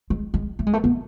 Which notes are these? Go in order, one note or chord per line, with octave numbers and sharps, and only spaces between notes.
G#3
G#3
A3
G#3
A3
B3